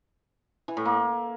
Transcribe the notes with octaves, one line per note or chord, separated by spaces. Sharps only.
E3
A2
A#3